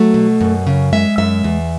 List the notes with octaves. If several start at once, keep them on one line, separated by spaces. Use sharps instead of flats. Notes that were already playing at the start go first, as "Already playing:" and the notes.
Already playing: F#3 A3
B2
F#2
C#3
G#3 E5
F#2 E5
E2